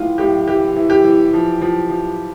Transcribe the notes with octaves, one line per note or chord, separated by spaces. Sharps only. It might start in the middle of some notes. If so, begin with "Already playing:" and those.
Already playing: A2 E3 F4
A2 G4
E3 G4
E3
G4
E3
F3
F3
F3